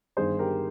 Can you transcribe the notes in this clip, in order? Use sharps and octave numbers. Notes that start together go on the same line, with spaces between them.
G1 G2 D#3 G#4 C5
G4 A#4